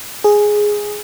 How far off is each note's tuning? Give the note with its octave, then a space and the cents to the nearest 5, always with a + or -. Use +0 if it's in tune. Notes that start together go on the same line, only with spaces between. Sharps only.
G#4 +0